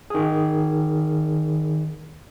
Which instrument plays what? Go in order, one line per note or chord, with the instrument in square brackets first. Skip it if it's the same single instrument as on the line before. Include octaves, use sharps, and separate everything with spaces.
[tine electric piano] D#3 G#4